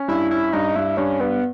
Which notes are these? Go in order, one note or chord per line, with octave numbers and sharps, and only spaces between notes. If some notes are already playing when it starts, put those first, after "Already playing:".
Already playing: C#4
G2 E4
C#4 E4
G2 D#4
G2 E4
G2 C#4
G2 B3